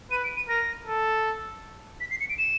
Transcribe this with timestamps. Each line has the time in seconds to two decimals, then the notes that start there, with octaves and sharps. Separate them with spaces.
0.11 B4 D#7
0.24 D7
0.36 D#7
0.48 A#4 A#6
0.86 A4
2.01 B6
2.11 C7
2.20 C#7
2.29 D7
2.38 E7